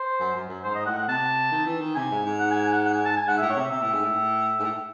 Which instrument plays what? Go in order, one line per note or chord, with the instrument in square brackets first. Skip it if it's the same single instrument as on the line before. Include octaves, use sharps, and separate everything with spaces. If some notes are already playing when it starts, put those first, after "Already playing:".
Already playing: [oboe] C5
[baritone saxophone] F#2
F#2
F#2
[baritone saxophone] G#2 [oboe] C5
[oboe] D#5
[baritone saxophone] A2 [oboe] F#5
[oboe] F#5
[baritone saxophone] C3 [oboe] A5
[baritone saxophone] D#3
E3
D#3
[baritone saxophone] C3 [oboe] G#5
[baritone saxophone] G#2
G#2
[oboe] F#5
G#5
G#5
F#5
F#5
G#5
A5
G#5
[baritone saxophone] G#2 [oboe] F#5
[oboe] E5
[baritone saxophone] A2
[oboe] C#5
[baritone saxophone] C3 [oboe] E5
[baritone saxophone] C3 [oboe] E5
[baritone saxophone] A2
G#2
A2
G#2
A2